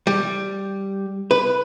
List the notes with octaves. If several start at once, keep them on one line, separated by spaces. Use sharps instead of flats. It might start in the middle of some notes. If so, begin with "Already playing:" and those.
G3
B4